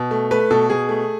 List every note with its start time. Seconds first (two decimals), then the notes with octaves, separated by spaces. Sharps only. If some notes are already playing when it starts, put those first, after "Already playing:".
Already playing: B2
0.11 A3
0.31 A3 B4
0.51 B2 A4
0.70 B2 G#4
0.89 A3